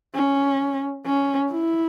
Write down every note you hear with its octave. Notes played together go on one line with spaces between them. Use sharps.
C#4
C#4
E4